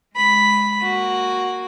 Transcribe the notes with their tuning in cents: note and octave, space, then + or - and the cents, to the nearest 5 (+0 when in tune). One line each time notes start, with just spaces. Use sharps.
G#3 +0 B5 +0
A#3 +0 F#4 +0